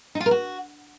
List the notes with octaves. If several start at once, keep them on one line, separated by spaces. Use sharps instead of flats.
D#4
F4
A#4
F#4